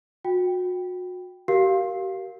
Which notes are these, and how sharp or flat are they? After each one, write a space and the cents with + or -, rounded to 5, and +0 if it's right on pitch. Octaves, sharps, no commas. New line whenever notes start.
F#4 -30 G5 +0
G4 -35 A#4 +0 F5 +0